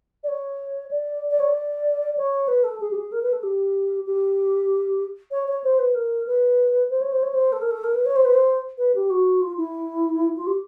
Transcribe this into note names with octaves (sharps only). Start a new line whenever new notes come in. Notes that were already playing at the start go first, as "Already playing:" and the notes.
D5
C#5
D5
D5
C#5
D5
C#5
B4
A4
G#4
G4
G#4
A#4
B4
A4
G4
G4
C#5
C#5
C5
B4
A#4
B4
C5
C#5
C5
C#5
C5
A4
A#4
A4
A#4
B4
C#5
C5
B4
C5
B4
G4
F#4
F4
E4
F4
G4